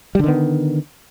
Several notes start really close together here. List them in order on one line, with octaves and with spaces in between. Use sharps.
G3 D3 D#3 B3